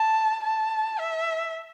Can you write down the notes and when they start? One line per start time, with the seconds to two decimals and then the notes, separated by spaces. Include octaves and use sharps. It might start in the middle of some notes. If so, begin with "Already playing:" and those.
Already playing: A5
0.43 A5
0.99 E5